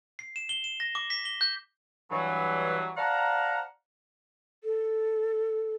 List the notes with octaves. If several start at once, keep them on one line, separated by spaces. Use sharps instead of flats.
C7
E7
G7
E7
A#6
D6
B6
G7
G6
G2 E3 F#3
C5 D5 F5 F#5 A5 A#5
A4